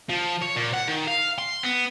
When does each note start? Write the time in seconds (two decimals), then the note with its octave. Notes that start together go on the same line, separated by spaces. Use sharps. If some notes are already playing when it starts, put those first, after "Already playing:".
0.09 F3
0.42 C#5
0.56 A#2
0.73 F#5
0.87 D#3
1.07 F5
1.38 C6
1.63 B3